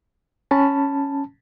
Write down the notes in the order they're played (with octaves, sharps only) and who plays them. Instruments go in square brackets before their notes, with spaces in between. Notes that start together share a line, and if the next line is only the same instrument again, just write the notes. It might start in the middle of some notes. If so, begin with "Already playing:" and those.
[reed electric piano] C#4 A5 B5